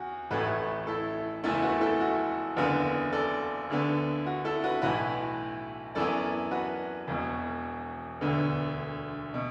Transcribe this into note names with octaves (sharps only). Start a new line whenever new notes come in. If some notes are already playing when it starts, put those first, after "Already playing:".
Already playing: E2 F#4
A1 A2 A3 F#4 B4
E4 A4
F#1 E2 E3 A3 E4 A4
F#4 B4
E4 A4
F#4
F#1 E2 D3 B3 F#4 B4
A4 D5
D2 D3 B3
F#4
E4 A4
F#4 B4
B1 A2 E3 F#4 B4
F#2 E3 B3 A4 D5
F#4 B4
E1 E2 B2
E1 D2 D3 B3
B2